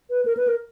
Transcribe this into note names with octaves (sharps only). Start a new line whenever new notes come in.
B4
A#4
B4
A#4